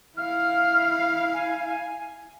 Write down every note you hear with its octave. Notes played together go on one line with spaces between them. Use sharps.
E4 F5 F6
G#5